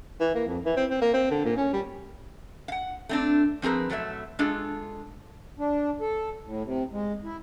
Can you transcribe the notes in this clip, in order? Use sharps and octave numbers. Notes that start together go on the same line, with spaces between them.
E3
A#3
F2
E3
C4
C4
A#3
C4
D3
A#2
C#4
G3
F5 F#5
A3 C4 D4
F3 C4 G#4 A#4 B4
B2 F#3 A3 C#5 E5
G#3 D4 F4 G#4 A4
D4
A4
A2
C3
G#3
E4